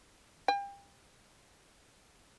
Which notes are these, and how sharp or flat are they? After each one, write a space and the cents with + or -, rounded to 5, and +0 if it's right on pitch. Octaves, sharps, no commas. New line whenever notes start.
G5 +30